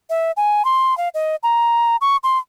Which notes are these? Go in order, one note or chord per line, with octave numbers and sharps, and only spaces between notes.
E5
G#5
C6
F5
D#5
A#5
C#6
C6